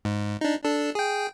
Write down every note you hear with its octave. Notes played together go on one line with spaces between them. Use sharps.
G#2
D4 D#4
D4 A4
G#4 G5